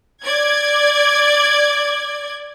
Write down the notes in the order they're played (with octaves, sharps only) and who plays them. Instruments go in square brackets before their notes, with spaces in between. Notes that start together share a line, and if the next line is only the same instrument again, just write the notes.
[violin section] D5 G#6